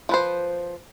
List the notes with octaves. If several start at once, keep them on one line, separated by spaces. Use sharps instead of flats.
F3 B4 C5